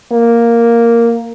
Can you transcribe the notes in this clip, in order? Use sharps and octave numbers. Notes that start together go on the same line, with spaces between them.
A#3